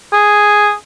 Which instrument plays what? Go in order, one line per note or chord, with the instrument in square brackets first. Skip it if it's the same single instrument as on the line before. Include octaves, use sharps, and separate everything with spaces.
[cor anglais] G#4